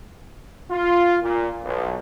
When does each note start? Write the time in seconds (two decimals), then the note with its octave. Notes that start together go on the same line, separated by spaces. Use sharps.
0.71 F4
1.23 A#2
1.64 B1